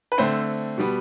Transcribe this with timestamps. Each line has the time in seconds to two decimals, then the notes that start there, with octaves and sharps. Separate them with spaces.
0.12 B4
0.18 D3 A3 C4 C5
0.78 B2 G3 B3